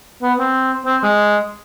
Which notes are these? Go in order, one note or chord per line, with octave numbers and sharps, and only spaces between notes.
B3
C4
C4
G#3